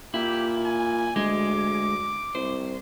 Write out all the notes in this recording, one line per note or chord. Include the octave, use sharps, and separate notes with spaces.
A#2 E4 G4
G#5
D2 G#3 D6
C2 C5